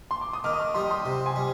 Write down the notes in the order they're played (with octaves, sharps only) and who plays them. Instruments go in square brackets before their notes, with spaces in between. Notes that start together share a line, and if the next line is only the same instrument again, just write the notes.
[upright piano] C6
D6
D#6
[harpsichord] D#3 [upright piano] D6 F6
[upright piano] D#6
D6 F6
[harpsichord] G3 [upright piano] C6 D#6
[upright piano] C6 D#6
[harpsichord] C3
[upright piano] G#5 C6
[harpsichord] G3